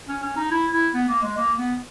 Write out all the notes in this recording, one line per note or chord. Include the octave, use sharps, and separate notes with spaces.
C#4
C#4
D#4
E4
E4
B3
A#3
G#3
A#3
B3